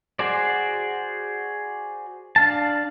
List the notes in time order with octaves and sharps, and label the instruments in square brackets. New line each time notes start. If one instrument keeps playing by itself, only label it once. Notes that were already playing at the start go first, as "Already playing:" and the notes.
[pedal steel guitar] F#4 G#4 C5 D5
D4 F5 A5